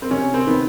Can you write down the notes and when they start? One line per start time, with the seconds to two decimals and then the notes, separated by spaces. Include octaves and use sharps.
0.02 C4
0.11 C3 C#4
0.34 C4
0.46 D#3 B3